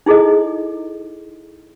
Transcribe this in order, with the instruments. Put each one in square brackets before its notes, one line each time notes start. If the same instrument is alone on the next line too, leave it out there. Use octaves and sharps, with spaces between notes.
[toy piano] D#4 E4 G#4 A4 D#5